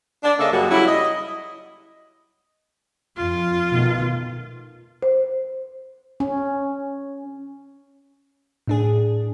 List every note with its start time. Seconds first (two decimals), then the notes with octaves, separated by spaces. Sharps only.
0.24 D4
0.39 C#3 A#3 A4 D#5 E5
0.52 F#2 C#3 G3 A#3 F#4
0.71 F#3 G3 E4
0.88 D#5
3.17 F2 F4
3.71 B2 D#3 A3
5.03 C5
6.20 C#4
8.67 A2 D4 G#4